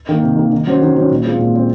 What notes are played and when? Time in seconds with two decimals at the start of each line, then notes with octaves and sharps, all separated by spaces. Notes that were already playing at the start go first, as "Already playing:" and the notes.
0.09 D#3 A#3
0.23 C3
0.37 D#3 A#3
0.52 D#3
0.67 F#3 C#4 F#4 C5
0.82 D#3
0.96 F#3 C#4 F#4 C5
1.11 A#2
1.24 G#3 C4 F4
1.39 A#2
1.55 G#3 C4 F4